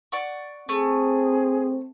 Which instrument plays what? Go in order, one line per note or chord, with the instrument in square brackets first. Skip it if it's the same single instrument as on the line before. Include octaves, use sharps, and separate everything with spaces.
[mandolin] D5 F#5 C#6
[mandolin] A3 [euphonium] C4 [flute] G#4